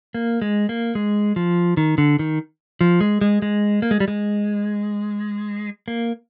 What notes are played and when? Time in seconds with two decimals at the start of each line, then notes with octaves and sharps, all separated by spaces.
0.15 A#3
0.42 G#3
0.69 A#3
0.95 G#3
1.36 F3
1.77 D#3
1.98 D3
2.19 D#3
2.81 F3
3.01 G#3
3.21 G#3
3.42 G#3
3.82 A#3
3.91 G#3
4.00 G3
4.08 G#3
5.88 A#3